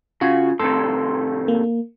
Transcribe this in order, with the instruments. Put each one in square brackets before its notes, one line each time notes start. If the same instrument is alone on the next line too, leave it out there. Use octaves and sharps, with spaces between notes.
[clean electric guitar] C#3 [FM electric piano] F4 [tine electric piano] F#4
[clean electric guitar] A2 C3 D#3 [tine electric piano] A4 [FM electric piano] C6
[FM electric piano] A#3